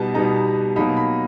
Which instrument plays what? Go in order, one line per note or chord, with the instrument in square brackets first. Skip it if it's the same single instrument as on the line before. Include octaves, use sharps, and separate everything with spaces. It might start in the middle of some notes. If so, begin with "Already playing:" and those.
Already playing: [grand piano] B2 G3 B3 D#4 A5
B2 G3 B3 D#4 A#5
B2 F#3 A#3 D#4 B5
B5